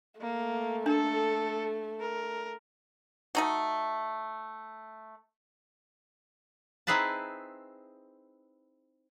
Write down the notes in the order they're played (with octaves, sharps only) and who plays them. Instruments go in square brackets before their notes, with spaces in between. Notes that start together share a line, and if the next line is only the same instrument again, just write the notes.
[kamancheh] A3 [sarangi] A#3
[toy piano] D4 [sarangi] A4
[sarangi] A#4
[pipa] A3 D#4 F#4
[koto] C4 D#4 E4 G#4 B4 A5